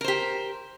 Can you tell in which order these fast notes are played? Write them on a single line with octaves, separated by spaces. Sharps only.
A#4 C5 G4